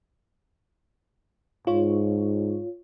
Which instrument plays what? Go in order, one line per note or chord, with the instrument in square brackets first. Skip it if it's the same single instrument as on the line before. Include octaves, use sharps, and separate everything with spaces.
[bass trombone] G#2 [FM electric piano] F4 C#5